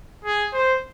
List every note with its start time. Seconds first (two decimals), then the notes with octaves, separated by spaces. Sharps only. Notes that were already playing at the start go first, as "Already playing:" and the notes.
0.24 G#4
0.53 C5